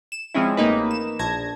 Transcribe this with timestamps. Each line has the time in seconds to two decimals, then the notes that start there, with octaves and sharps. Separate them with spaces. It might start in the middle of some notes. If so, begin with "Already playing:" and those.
0.12 E7
0.34 F3 G#3 C4 C#4 E4
0.57 A1 A#3 D#4 B4
0.91 E7
1.19 A#1 A5 G#6 A#6